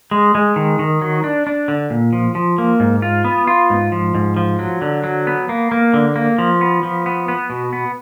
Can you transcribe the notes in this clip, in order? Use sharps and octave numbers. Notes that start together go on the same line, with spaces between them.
G#3
G#3
D#3
D#3
F#3
D4
D4
D3
A#2
F3
F3
A#3
G#2
F4
B3
F4
G#2
F3
G#2
F3
F#3
D3
F#3
B3
A#3
A#3
D3
A#3
F3
B3
F3
B3
B3
B2
B3